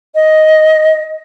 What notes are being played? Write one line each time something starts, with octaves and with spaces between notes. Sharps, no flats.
D#5